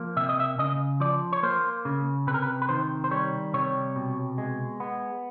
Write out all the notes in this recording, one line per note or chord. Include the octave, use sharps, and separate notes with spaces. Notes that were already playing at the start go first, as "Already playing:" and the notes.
Already playing: F3 A#3
C3 E5
D#5
E5
C#3 D#5
F3 D5
C#5
A#3 C5
C#3
C3 B4
A#4
B4
B4
D#3 C5
C5
G3 C#5
C3 C#5
B2
G#3
B3